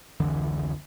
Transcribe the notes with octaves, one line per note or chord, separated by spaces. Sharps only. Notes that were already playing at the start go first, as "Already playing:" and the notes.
F1 C#2 D3 E3